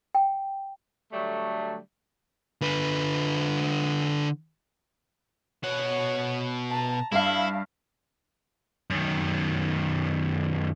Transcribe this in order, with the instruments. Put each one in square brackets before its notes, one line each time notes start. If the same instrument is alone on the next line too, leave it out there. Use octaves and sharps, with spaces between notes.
[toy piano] G5
[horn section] D3 F#3 G3 A3
[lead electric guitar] D3 B4
[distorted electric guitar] B2 F#5 [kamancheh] C#5
[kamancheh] A5 A#5
[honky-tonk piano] G2 E5 F5 [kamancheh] D4 [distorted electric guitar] E4
[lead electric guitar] F#2 D#3